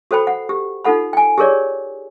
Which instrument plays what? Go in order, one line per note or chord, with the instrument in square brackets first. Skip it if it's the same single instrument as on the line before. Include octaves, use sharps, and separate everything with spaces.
[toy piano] F#4 A4 C5 G5 B5
F#5
G4
D#4 F4 A4 F#5 B5
G5 G#5
G4 G#4 A#4 C#5 D5